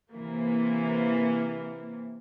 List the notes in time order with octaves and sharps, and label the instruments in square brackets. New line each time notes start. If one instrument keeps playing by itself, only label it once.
[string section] C3 E3 A#3